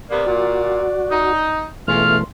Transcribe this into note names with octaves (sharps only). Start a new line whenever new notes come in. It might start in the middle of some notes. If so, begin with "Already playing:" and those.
C3 A#3 B3 D5
A#2 F#4
D#4
B2 E3 G#3 A3 C#4 F4 F6